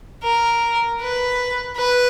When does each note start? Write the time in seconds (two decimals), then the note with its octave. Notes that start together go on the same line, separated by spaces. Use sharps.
0.23 A#4
1.01 B4
1.77 B4